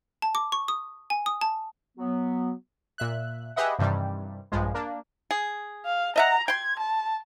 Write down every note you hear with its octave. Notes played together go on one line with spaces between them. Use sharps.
A5
D6
C#6
D#6
G#5
D#6
A5
F#3 B3
A#2 E5 F#6
G4 G#4 B4 D#5 E5 F#5
G2 C3 D#3 E3 G3
A#1 G2 F3 G#3
A#3 D4
G#4
F5
D#5 E5 F#5 A#5
G5 C6 G#6
A5